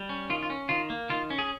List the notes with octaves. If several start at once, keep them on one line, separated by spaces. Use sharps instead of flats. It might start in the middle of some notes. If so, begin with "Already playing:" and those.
Already playing: G3
C#4
D#3 F4
F4
C#4
D#3 F4
A#3
D#3 F4
C#4
G#4